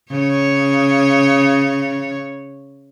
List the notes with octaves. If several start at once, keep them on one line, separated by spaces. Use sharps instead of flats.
C#3 C#5